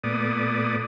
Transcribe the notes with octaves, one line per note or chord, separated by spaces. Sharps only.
A#2 A3 B3 D5 D#6